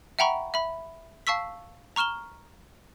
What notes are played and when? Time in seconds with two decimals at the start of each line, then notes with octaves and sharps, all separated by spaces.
0.19 E5 F#5 G5 A#5 B5 C#6
0.54 E5 B5
1.27 F5 A5 C#6 E6 B6
1.96 A#5 C#6 F6 E7 G7